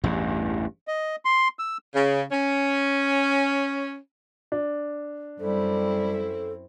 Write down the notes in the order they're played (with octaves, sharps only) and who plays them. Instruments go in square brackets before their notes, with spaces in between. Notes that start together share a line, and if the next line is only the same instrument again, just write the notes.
[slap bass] A1 E2 G2
[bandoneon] D#5
C6
E6
[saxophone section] C#3
C#4
[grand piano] D4
[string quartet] F#2 C4 E4 [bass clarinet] G3 [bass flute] A4